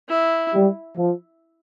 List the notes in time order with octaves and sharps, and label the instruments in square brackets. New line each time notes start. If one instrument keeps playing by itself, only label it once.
[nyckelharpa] E4
[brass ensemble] G3
F3